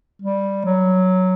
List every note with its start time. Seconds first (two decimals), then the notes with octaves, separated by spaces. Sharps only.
0.22 G3
0.65 F#3